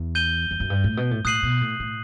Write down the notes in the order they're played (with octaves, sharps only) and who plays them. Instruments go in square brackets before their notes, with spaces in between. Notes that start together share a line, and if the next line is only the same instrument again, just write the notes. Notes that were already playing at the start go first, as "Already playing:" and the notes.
Already playing: [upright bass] E2
[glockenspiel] G6 D#7 G7
[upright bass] E2
F#2
G2
A2
B2
A2
[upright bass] A2 [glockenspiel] D#6 F#6 C7 D#7 F#7
[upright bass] B2
A2
A2